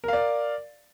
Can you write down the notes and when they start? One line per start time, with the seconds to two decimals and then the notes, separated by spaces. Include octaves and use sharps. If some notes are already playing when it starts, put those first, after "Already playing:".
0.04 A#4
0.08 F5
0.13 D5